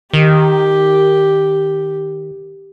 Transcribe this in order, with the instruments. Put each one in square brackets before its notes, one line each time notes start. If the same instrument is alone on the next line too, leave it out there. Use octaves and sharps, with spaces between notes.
[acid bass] D#3 [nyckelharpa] G4